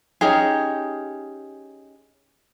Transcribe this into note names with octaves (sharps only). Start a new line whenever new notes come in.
C#4 D#4 G4 G#4